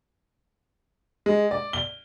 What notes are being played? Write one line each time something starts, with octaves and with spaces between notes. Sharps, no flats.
G#3
D5
G7